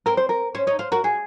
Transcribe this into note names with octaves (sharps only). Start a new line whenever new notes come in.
C4 A#4
C5
A#4
C#4 C5
D#4 C#5
F4 C5
F#4 A#4
F#4 G#4